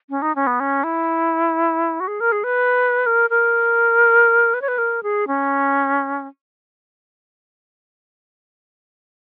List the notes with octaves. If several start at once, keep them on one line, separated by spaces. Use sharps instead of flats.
C#4
D#4
C#4
B3
C#4
E4
F#4
G#4
A#4
G#4
B4
A#4
A#4
B4
C#5
B4
A#4
G#4
C#4